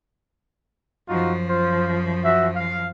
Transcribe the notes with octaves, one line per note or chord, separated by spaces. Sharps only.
F#2 F3 D#4 F4 F#4
F4 C5
F#4 E5
F5